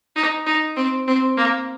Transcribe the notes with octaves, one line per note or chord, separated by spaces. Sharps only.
D#4
D#4
C4
C4
A#3